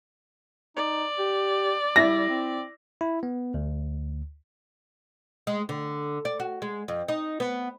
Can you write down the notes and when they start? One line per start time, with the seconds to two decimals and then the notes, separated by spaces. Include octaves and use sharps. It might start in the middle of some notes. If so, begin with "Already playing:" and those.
0.76 D#4 D5
1.19 G4
1.96 G3 E4 A#6
2.29 C4
3.01 E4
3.23 B3
3.54 D2
5.47 G#3
5.69 D3
6.25 D5
6.40 F#4
6.62 G#3
6.88 F2
7.08 D#4
7.40 B3